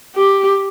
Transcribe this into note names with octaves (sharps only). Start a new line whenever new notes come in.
G4